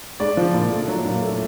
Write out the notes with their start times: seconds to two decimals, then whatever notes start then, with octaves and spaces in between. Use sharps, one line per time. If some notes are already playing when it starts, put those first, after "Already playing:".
0.20 G#3 D5
0.37 F3
0.54 A#2
0.72 A3
0.88 F#3
1.05 A#2
1.22 A3